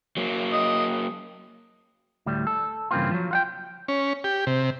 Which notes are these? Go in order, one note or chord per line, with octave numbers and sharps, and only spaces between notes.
F#3 A#3
D#5
D2 A2 G3
A4
G2 C#3 E3 A#3 C4 F4
F3 F#3
F4 F#5 G5
C#4
G4
C3